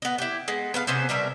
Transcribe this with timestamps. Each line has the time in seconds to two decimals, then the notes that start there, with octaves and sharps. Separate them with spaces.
0.02 B3 D#5
0.18 E4 G4
0.48 G#3 B3
0.74 B3 B4 F5
0.87 C3 B3 C#4 C5
1.09 B2 G3 A#4 E5